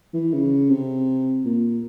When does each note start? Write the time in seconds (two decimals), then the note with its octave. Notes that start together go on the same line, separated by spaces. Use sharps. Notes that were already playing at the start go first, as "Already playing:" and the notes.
0.14 E3
0.33 C#3
0.69 C3
1.45 A#2